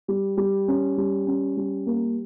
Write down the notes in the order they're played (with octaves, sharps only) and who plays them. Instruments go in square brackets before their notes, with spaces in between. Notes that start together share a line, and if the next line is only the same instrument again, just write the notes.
[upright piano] G3
G3
C#4
G3
C#4
G3
A#3